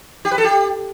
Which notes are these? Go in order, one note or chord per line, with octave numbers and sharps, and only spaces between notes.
G4
B4
A4
G4